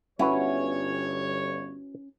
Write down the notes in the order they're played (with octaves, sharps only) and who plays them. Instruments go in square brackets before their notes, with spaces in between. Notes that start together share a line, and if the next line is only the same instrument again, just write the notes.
[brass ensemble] G1 C#5 [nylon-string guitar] C#4 [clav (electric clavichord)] E4 F#4 B4